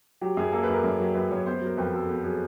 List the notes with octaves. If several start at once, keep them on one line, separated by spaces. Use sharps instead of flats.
F#3 G4
F#2 G#4
A#3 A4
B4
F#2
A#4
F#2
F#3
F#2 B4
F#2 C#5
B3 C5
F#3
A#4
F2 B4
F#3 A4
B3 G#4
F#3 G#4